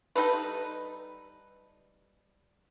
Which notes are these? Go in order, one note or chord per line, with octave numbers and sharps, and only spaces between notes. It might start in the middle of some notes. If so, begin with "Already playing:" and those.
G3 D#4 A4 B4